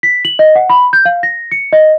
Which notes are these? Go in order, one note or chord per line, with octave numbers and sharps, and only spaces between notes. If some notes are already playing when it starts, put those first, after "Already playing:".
B6
F#7
D#5
F#5
B5
G6
F5
A#6
C#7
D#5